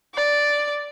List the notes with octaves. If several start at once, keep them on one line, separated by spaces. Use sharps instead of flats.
D5